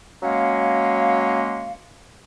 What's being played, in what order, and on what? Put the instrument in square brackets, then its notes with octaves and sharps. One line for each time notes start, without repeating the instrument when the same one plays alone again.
[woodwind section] F#3 G#3 A#3 C#4 C#5 F5